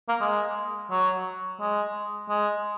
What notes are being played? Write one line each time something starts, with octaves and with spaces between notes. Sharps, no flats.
A#3
G#3
F#3
G#3
G#3